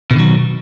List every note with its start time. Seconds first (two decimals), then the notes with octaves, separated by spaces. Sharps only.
0.11 B2
0.13 D3
0.16 D#3
0.19 F#3